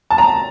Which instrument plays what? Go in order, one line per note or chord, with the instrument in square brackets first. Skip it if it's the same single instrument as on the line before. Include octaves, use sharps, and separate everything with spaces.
[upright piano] A5
A#5